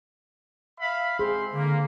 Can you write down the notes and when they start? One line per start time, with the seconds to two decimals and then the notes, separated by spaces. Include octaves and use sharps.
0.80 E5 F5 B5
1.19 C4 G#4 C5 C6
1.53 D3 A#3